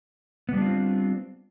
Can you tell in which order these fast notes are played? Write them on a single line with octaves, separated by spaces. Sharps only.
B3 G3 D4 F4 C4